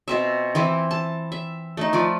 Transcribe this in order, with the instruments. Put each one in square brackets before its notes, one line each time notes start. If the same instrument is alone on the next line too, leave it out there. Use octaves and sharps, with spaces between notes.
[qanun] B2 C4 E5
E3 C4 E4
A5
E5
A3 D#4
F3 F4 D5